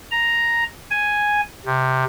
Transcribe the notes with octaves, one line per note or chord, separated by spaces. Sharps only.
A#5
G#5
C3